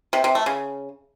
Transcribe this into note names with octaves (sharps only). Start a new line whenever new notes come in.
C3
C3
A3
C#3